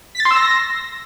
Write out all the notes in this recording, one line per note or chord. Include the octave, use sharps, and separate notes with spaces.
B6
A6
C6
E6
A#6